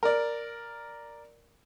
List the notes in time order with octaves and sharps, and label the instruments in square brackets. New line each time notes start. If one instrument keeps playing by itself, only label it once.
[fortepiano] A#4 D5